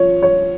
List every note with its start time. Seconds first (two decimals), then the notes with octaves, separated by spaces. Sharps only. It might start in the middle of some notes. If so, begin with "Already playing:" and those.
Already playing: F3 C#5
0.23 C#5